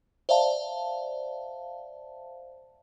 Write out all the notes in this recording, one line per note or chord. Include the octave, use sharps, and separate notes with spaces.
C5 D5 E5 F5 A5